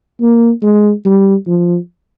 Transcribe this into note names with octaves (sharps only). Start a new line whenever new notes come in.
A#3
G#3
G3
F3